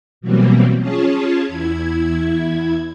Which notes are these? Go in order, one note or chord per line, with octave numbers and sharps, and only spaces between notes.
B2 E3 F#3 G3 A#3 C4
C#4 F4 G#4 C#5 A5
E2 E4 G#6